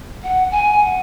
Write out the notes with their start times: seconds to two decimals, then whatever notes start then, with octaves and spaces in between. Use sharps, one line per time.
0.23 F#5
0.51 G#5
0.79 F#5